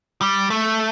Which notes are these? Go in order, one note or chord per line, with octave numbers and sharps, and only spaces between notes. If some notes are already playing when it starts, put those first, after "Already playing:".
G3
A3